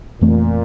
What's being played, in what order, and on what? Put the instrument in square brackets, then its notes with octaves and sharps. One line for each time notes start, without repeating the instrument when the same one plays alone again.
[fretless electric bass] F2 E3 A3 C4 [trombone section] A#2